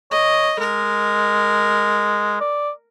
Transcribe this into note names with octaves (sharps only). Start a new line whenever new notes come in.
C#5 D#5
G#3 A#4
D5